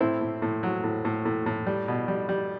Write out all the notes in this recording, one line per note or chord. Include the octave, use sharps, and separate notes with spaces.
A2 C4 E4
A2
A2
F#3
A2
A2
A2
A2
G3
B2
G3
G3